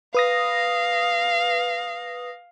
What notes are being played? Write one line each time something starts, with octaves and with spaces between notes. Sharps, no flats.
B4 F5 D#6 A#6